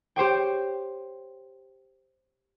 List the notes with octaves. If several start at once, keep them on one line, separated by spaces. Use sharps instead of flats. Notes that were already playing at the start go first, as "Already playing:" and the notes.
G4 C5 C#5 G5